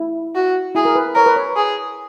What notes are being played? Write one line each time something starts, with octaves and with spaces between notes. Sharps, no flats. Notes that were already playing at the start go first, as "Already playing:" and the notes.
Already playing: E4
F#4
E4 G#4
A#4
B4
A#4 C#5
B4
C#5
G#4